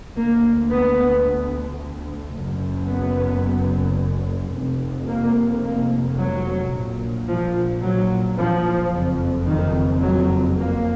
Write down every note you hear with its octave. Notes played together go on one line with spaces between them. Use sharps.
D2 A#3
B3
F#1 F#2
B3
F1 F2
A#3
A#3
F#3
A#1 A#2
F3
F#3
F3
F#1 F2
D#3
F#3
A#3